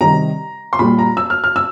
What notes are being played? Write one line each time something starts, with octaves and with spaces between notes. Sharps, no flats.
C3 D#3 G3 A#5
C6
A#2 G3 B5
A#5
E6
F6
F6
E6